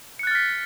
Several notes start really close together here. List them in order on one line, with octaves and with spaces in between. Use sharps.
C#7 F#6 A6 F6 B6